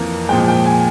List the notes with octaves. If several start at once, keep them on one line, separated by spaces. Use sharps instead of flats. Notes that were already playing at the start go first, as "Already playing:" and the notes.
Already playing: F2 E3 A#3
A#2 F3 G#3 G5
G5
G#5